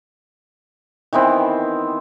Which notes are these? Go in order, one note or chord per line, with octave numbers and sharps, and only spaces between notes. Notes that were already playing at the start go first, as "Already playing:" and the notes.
D#3 E3 B3 C4